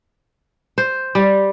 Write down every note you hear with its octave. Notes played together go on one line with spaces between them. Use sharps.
C5
G3